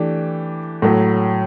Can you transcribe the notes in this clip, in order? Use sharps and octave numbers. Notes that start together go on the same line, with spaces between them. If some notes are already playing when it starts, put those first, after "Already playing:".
Already playing: E3 A3 D4 G4
A2 F#3 A3